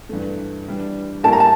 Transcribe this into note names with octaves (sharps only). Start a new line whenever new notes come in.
G2 E3 A3
E3 G3 D4
A2 G3 A#3 E4 G4 A5
A#5
A5